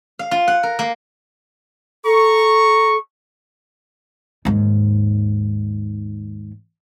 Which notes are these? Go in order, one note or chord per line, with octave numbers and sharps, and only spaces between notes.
F5
F4
F#5
A#4
A#3
A4 A#5 C#6
D#2 G#2